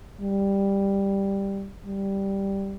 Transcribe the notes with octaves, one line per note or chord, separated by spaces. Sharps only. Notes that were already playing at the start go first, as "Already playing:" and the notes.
G3
G3